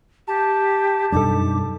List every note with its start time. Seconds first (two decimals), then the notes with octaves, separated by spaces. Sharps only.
0.28 G4 A5
1.12 F#2 B2 G3 D4 D#4 A4 D6